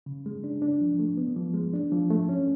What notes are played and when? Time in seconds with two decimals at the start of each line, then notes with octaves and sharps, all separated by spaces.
0.06 C#3
0.26 G#3
0.44 D4
0.62 D4
0.81 F3
0.99 A3
1.18 B3
1.36 F3
1.54 G#3
1.74 D4
1.92 F3
2.10 A3
2.29 C#4